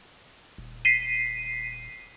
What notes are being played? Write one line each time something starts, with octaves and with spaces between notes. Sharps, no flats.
D#1
B6 C7 D#7